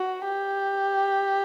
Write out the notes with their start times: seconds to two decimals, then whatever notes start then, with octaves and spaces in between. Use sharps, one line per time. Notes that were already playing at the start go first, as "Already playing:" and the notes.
Already playing: F#4
0.25 G4